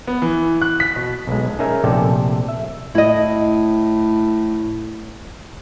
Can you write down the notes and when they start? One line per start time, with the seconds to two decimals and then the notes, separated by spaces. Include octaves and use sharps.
0.07 B3
0.22 E3
0.62 F#6
0.80 B6
0.96 B2
1.27 B1 G#3
1.59 C#4 D#4 G#4 A#4 E5 G#5
1.84 A#1 C3 A3 A4 D5 G5
2.49 E5
2.95 A2 E4 D#5